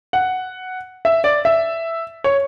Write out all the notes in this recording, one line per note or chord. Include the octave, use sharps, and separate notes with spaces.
F#5
E5
D5
E5
C#5